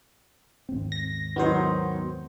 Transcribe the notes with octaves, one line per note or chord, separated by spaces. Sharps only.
D#2 G#2 C4
A#6
D#3 F#3 B3 D#4 F#4 C5